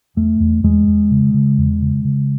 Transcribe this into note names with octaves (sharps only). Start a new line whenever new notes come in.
E2 A3
E2
E2 G#3
E2
C#3
C#3
E2
C#3
C#3